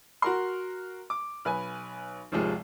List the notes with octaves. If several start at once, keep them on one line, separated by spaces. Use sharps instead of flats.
F#4 A#4 C6
D6
B1 B4 G#5
G#1 D#2 C3 F3 G#3